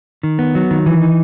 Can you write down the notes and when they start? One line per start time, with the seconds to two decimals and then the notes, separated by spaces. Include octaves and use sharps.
0.23 D#3
0.39 B3
0.55 F#3
0.71 D#3
0.86 E3
1.01 D#4